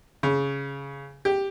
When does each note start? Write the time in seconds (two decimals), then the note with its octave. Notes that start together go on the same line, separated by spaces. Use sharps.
0.23 C#3
1.25 G4